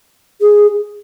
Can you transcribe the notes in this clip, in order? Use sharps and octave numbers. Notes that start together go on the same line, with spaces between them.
G#4